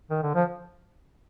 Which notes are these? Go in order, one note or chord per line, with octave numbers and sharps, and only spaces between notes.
D#3
D3
F3